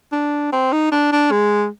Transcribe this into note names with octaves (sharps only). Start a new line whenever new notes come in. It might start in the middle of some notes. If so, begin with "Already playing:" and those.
D4
C4
D#4
D4
D4
G#3